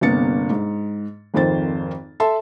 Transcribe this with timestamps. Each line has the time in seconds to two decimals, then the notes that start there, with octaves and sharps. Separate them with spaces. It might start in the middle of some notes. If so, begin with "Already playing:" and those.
0.01 G1 C3 A#3 B3 A6 C#7
0.50 G#2
1.34 G#1 F2 D#3 C5 A6
2.20 A4 E5 A5 C6